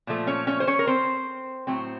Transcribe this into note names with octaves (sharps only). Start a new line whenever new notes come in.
A#2 F3 A3
C#4 C#5
C#4 C#5
C5
C#4 C#5
A#4
C4 C5
A2 F#3 C4